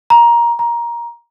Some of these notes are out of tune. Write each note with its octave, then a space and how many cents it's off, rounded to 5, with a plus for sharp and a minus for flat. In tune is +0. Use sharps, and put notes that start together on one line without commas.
A#5 +15
A#5 +15